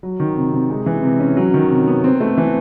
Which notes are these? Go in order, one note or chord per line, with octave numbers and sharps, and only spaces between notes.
F#3
D#3
C3
C3
G#3
E3
C3
C#4
F#3
D#3
C3
B3
C4
A3
E3